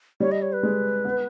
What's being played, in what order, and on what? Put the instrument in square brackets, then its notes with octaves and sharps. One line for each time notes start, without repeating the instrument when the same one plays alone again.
[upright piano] G3 [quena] C#5
[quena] D#5
C#5
B4
[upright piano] G#3
B3